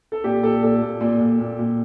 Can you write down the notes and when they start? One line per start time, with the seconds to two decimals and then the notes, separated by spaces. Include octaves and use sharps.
0.12 A4
0.24 A#2 G4
0.43 A#2 A4
0.63 A#2 A4
0.82 A#2
1.01 A#2
1.20 A#2
1.40 A#2
1.59 A#2